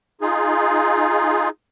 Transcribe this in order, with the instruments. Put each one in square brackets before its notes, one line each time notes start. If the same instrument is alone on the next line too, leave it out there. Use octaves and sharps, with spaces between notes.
[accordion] D#4 F4 G#4